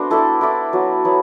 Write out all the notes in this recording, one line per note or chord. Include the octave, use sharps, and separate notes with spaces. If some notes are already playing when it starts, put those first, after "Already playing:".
Already playing: A3 B3 D4 F#4 C5
E4 A4 D5
E4 A4 D5
F#3 B3 F#4
F#3 B3 E4